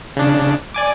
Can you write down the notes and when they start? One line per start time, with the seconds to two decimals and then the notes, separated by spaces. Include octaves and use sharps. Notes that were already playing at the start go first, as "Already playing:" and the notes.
0.17 C#3 D4
0.74 D5 G#5 D6